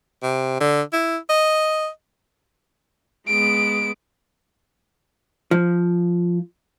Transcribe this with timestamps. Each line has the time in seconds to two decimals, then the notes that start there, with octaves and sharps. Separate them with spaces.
0.22 C3
0.60 D3
0.93 E4
1.30 D#5
3.28 G#3 B3 D7
5.51 F3